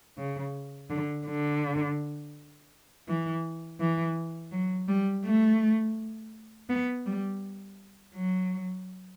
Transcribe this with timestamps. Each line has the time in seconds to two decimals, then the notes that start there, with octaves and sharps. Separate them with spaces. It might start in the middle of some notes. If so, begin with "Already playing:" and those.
0.18 C#3
0.90 D3
1.27 D3
3.08 E3
3.80 E3
4.52 F#3
4.88 G3
5.25 A3
6.69 B3
7.06 G3
8.15 F#3